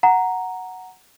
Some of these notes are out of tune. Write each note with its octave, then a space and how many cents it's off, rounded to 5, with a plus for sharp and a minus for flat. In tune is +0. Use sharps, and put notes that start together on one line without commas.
F#5 +0 A#5 +0